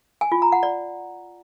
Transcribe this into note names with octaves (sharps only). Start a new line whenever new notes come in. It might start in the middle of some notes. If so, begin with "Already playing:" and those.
G#5
F4
A#5
F#5
D5